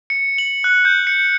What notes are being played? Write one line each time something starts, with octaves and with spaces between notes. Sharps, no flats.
C#7
F#7
F#6
G6
C#7